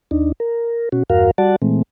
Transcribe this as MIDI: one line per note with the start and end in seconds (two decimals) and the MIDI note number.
0.11 0.32 39
0.11 0.32 62
0.11 0.32 63
0.40 0.89 70
0.92 1.03 47
0.92 1.03 61
0.92 1.03 66
1.10 1.31 40
1.10 1.31 43
1.10 1.31 66
1.10 1.31 70
1.10 1.31 77
1.38 1.56 55
1.38 1.56 66
1.38 1.56 74
1.38 1.56 78
1.38 1.56 81
1.62 1.82 46
1.62 1.82 52
1.62 1.82 56
1.62 1.82 57
1.62 1.82 60